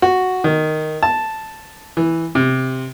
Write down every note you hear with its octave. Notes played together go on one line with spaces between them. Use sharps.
F#4
D#3
A5
E3
C3